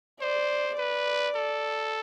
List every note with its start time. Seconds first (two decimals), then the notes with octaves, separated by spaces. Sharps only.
0.21 C5 D5
0.78 B4 D5
1.36 A4